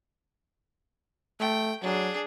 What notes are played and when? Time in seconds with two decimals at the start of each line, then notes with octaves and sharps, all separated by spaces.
1.40 A3 G5
1.82 F#3 D4 G#4